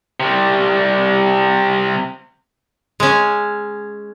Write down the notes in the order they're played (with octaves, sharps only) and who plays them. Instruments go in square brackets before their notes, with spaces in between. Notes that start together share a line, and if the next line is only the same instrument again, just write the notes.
[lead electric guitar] C3 G3
[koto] G#3 C#4